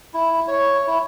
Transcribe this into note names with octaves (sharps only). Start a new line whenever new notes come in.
E4
C#5
E4